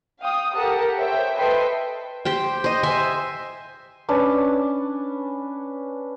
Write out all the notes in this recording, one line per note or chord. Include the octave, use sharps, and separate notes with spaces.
F5 G5 D#6
G4 A4 A#4 F#5 A5
C5 C#5 E5 G5
A4 B4 D#5 E5 G5 C6
G4 C5 G5
C5 D#5
C5 E5 G#5
C#4 D4 B4 A5